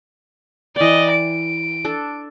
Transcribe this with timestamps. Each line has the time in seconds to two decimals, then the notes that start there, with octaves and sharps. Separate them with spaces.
0.76 E3 D5 D#5 G5
1.11 D7
1.85 D4 A4